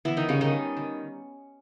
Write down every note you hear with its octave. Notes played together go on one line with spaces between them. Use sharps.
E3 B3 E4
D#3 D#4
C#3 G3 C#4
D#3 D#4
D#3
D#3